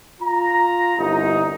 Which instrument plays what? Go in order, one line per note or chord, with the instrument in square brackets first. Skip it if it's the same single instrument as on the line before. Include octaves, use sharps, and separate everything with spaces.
[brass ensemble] F4 A#5
G1 C2 D#4